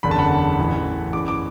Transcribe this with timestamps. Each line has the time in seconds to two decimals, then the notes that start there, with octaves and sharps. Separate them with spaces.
0.03 F#1 E2 D3 B5
0.11 A5
0.18 F#5 B5
0.59 A1 A2 E3
1.13 F#1 E2 E3 D6
1.28 D6